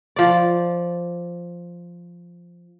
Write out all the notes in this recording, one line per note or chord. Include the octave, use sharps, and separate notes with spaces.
F3 D5